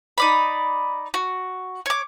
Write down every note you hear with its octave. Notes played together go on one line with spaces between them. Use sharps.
D#4 D5 B5
F#4
C#5 D6